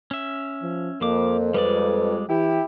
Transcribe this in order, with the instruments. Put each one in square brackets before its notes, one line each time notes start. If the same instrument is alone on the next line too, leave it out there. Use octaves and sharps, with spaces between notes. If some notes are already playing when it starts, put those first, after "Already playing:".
[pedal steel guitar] C#4 E5
[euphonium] F3
[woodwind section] F2 [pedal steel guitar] F3 D6 [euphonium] A#3
[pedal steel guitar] G3 G#3 D5 [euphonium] B4
[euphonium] E3 [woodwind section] E4 G4